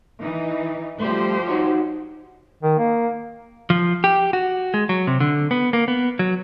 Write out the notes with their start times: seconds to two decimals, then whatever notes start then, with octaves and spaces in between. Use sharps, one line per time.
0.21 E3 D#4
1.00 F3 G3 A3 G4 C5
1.48 D#4 F#4 C#5
2.63 D#3
2.78 A#3
3.70 F3
4.04 G4
4.33 F#4
4.74 G#3
4.89 F#3
5.07 C3
5.20 D3
5.51 B3
5.73 A#3
5.88 B3
6.19 F#3